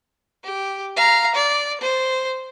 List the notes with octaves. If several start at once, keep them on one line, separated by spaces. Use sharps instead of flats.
G4
F5 A#5
D5
C5